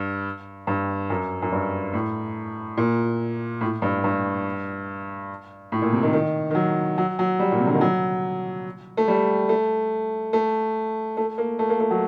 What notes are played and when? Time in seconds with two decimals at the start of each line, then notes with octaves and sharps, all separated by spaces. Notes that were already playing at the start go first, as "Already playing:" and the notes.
Already playing: G2
0.67 G2
1.10 F#2
1.42 F#2
1.52 G2
1.93 A2
2.77 A#2
3.61 A2
3.82 G2
4.04 G2
5.72 A2
5.82 A#2
5.92 C3
6.03 D#3
6.13 D#3
6.51 D#3
6.55 F#3
6.98 F#3
7.19 F#3
7.40 G3
7.52 A#2
7.59 C3
7.67 D3
7.74 D#3
7.81 F#3
8.97 A3
9.08 G3
9.49 A3
10.33 A3
11.17 A3
11.38 A#3
11.59 A3
11.70 A#3
11.80 A3
11.91 F#3